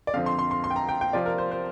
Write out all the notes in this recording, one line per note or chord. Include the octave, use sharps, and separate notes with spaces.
D5
F2 D3 F3 C4 F5
C6
C6
C6
C6
G5
A#5
G5
G5
C3 F3 C4 F4 D5
A#4
C5
C5